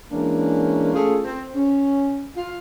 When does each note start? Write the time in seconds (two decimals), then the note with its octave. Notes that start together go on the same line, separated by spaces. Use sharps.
0.11 E3 G#3 A#3 C#4 D4 A#4
0.94 A3 C#4 F4 G#4 A4
1.24 C4
1.54 C#4
2.35 F4